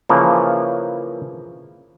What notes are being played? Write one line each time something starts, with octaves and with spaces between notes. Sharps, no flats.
C#3 E3 F3 A#3